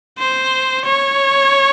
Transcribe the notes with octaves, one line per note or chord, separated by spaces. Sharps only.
C5
C#5